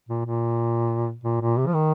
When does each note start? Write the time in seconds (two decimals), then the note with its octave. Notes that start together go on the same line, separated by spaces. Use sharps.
0.09 A#2
0.26 A#2
1.24 A#2
1.41 A#2
1.57 C3
1.67 F3
1.74 D#3